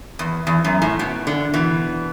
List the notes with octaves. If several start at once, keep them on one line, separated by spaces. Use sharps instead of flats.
E2
E2
F#2
A2
B2
D3
B2 E3